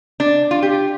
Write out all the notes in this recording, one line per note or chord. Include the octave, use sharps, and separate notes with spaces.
D4
F4
G4